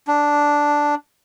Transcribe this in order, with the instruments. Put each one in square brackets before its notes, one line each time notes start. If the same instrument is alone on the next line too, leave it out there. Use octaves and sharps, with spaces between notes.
[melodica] D4